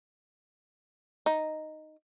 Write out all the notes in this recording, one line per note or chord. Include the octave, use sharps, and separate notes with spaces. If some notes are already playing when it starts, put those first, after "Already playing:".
D#4